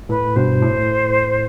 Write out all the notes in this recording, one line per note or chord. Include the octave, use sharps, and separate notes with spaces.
A2 B4
G2 B2 C5
A2